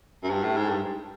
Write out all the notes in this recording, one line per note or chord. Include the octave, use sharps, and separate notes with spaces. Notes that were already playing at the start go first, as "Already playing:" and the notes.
F#2
G2
A2
G#2
G2